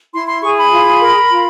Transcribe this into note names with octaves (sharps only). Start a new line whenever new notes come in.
E4 C6
C6
G#4 C#6
B5
F4
A#4
F4